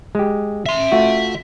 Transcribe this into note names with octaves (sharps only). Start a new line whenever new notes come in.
G#3 G4
E5 C6
A3 F4 F#4